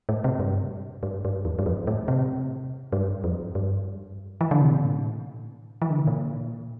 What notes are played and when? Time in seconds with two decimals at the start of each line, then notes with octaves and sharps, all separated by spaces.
0.09 A2
0.24 C3
0.40 G2
1.03 G2
1.25 G2
1.45 E2
1.59 G2
1.66 F2
1.87 A2
2.08 C3
2.92 G2
3.24 F2
3.55 G2
4.41 E3
4.51 D3
4.61 C3
4.71 A#2
4.82 A2
5.82 E3
5.90 D3
5.99 C3
6.07 A#2